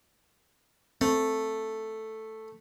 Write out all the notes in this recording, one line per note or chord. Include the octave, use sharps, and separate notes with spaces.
A3 C4